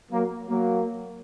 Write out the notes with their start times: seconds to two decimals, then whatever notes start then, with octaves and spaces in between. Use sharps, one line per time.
0.11 F#3 A#3
0.48 F#3 A#3